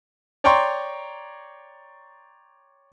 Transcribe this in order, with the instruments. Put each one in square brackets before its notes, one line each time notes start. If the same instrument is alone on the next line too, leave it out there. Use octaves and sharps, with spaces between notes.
[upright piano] C#5 D5 G5 A#5 C6 C#6